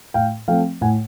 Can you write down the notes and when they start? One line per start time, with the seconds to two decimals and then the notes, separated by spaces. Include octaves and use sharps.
0.14 A2 F5 G5
0.48 F3 A3 C4 F5 G5
0.81 A2 F#5 G#5